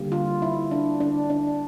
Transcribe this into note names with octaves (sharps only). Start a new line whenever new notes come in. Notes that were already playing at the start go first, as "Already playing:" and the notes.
Already playing: D3 G3 A#3
F4
E4
D4
D4
D4